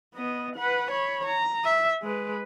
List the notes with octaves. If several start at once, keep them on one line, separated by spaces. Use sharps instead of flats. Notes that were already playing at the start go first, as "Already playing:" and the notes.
B3 D#5
B4 F#5
C#5 B5
A#5
E5
G#3 B4